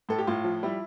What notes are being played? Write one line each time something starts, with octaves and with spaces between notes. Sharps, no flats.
A2 A4
G4
A2 F4
F3
G3 E4